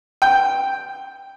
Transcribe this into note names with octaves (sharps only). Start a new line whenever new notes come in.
G5